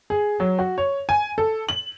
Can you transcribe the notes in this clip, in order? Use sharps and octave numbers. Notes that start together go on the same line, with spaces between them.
G#4
F#3
F#4
C#5
G#5
A4
F#7